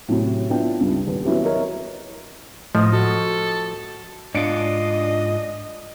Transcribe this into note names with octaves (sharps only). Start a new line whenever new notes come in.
A2 C3 F#3 C#4
B3 D4 E4 F4 G5
C#2 G2
D#1 B4
F#3 B3 C#4 E4 G4
A#4 C#5 D#5 E5
A2 F3 D#5
F#4 A4
G#2 D4 F4 D#5 C#7 D7